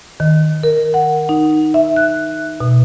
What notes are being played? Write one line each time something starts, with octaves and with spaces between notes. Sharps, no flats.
D#3
A#4
F#5
D#4
E5
F#6
B2